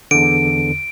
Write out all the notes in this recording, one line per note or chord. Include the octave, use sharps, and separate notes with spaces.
E2 D3 D7